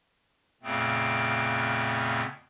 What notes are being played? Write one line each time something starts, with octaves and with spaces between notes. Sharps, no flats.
F2 A#2 C#3 A3 B3 C4